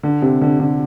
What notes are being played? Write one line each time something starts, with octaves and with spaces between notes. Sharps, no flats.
D3
C3
D3
D3